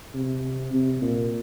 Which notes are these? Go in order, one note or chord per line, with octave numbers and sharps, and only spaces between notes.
C3
C3
A#2